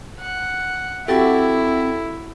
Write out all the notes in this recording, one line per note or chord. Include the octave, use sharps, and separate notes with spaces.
F#5
C4 E4 F#4 G4 A4 G5 A6